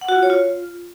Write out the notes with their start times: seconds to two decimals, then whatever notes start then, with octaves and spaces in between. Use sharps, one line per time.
0.01 F#5
0.09 F#4
0.16 F4
0.23 C#5
0.30 F4